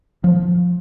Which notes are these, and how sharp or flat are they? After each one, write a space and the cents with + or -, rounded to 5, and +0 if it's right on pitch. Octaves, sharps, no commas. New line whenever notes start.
F3 +15